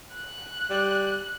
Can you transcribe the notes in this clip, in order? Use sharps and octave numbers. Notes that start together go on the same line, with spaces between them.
F#6
G3